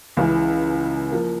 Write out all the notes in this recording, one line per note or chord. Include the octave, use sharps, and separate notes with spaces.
C#2 C#3 E3
F3 A#3